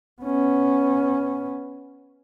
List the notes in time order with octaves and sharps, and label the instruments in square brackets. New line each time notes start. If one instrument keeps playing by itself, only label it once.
[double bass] B3 C#4